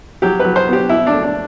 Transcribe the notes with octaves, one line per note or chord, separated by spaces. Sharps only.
F#3 G4
F#3 B4
C5
B3 G4
B2 E4
D4
A3
D4